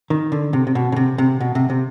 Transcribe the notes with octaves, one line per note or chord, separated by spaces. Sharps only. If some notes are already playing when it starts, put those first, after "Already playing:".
D#3
D3
C3
C3
B2
C#3
C3
C3
B2
C3
C3